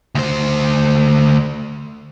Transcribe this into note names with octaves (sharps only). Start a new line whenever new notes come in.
D2 C5